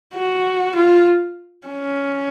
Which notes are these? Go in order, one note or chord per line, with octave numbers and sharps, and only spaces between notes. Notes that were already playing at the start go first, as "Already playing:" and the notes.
F#4
F4
C#4